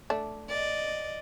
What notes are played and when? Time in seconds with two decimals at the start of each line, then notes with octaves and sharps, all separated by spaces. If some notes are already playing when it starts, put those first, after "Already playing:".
0.10 A3 D4
0.50 D5 D#5